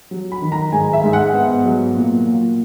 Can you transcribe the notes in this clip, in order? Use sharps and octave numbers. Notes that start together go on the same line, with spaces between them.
F#3
B5
D#3
A#5
G#2 G#5
E5
G#2
F#5
B3
F#3
A#2
A#2